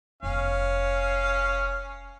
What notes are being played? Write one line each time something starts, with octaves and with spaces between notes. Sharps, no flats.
F1 B3 C#4 F5